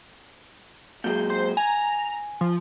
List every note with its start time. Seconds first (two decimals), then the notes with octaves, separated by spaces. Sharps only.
1.04 A#2 F#3 G#3 G6
1.30 C5
1.57 G#5 A#5
2.41 F3